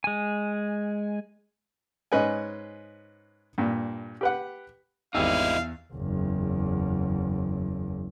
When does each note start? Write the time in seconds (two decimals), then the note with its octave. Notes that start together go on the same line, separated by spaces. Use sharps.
0.04 G#3 G#5
2.12 G#2 C#4 B4 D#5 G#5
3.58 G2 A#2
4.21 G4 B4 F#5
5.14 G#1 E2 G3 D#4 E4 F5 G5 E6
5.93 F#1 E2